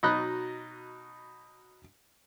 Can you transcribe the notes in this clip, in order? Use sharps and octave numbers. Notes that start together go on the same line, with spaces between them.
B2 F#3 D#4 D#5 B5 F#6